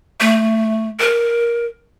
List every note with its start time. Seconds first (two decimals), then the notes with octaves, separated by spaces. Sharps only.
0.20 A3
1.00 A#4